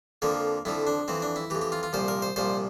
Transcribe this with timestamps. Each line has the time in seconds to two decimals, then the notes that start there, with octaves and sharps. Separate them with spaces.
0.22 F2 D3 F3 A#3
0.65 F2 D3 F3 E4
0.87 D4
1.08 F2 E3 C4
1.22 D4
1.36 E4
1.50 E3 G4
1.55 F2
1.61 G4
1.72 F4
1.83 F4
1.93 C2 A#2 F3 C5
2.08 A#4
2.22 C5
2.36 C2 A#2 F3 C5